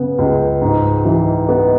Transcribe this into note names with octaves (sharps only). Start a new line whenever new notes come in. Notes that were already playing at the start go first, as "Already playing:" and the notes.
Already playing: C#3 B3
C#2
G#2
E3
B3